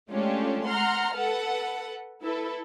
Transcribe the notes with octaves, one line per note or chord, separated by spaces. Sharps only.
G#3 A3 C#4 D4 F4 G4
F#5 A#5 C6 F6
A4 B4 F#5
E4 A4 B4